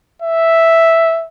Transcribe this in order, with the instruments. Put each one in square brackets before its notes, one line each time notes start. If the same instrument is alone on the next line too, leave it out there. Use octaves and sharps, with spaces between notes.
[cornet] E5